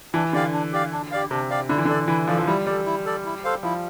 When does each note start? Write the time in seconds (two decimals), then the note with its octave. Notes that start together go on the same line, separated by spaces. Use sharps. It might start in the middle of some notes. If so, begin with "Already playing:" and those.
0.14 E3 D4
0.33 D3 G4 D5 F5
0.53 D4
0.73 G4 D5 F5
0.92 D4
1.11 G4 D5 F5
1.31 C3 D4
1.50 G4 D5 F5
1.69 D3 E4
1.78 E3
1.85 D3 A4 D5
2.08 E3 E4
2.28 F3 A4 D5
2.38 F3
2.47 G3 E4
2.67 G3 A4 D5
2.86 E4
3.06 A4 D5
3.25 E4
3.45 A4 C5 F5
3.63 F3 E4